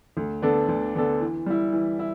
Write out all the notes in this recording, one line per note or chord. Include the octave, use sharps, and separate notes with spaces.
D2
D3 B3 D4 A4
D2
D3 B3 D4 A4
E3
G3 E4
E3
E4